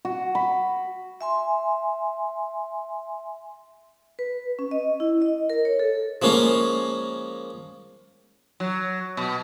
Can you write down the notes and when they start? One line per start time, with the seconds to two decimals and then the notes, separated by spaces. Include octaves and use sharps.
0.05 F#4
0.35 B5
1.21 E5 G#5 C6
4.19 B4
4.59 C#4
4.71 D#5
5.00 E4
5.22 D#5
5.50 A#4
5.65 C#5
5.79 A4
6.22 F3 G#3 A#3 C#4 F4
8.60 F#3
9.17 B2